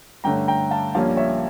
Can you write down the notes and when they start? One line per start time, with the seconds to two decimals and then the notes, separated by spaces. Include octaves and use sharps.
0.24 G2 D3 A3 C#4 G5 A#5
0.48 G5 A#5
0.71 F5 A5
0.94 A#1 A#2 G3 A#3 C#4 F5 A5
1.17 C#5 E5